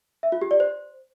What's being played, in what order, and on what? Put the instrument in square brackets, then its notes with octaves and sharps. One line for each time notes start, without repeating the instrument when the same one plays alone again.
[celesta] E5
F4
G4
D5
C5